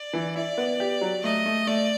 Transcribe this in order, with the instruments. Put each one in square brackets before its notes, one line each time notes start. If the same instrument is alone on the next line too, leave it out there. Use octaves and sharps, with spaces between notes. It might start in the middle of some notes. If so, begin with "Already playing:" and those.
Already playing: [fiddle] D5
[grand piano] E3
[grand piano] E4 [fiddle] D5
[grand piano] B3
G4
F#3
[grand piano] A3 [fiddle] D#5
[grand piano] A3
[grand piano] A3 [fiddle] D5